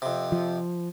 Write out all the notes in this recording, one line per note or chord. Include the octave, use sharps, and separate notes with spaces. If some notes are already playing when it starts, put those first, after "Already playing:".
F2 C3
F3